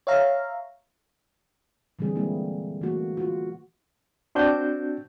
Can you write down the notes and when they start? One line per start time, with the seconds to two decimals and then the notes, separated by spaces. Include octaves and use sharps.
0.07 C#5 E5 F5 A#5
1.99 A#2 D3 E3 G3 C4 G#4
2.15 G#3 A#3 C4 E4
2.81 E3 A3 A#3 F#4
3.17 F4 F#4
4.35 C4 D4 F#4 G6